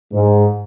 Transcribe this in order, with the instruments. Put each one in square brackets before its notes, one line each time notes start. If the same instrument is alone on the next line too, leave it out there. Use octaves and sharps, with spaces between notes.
[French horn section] G#2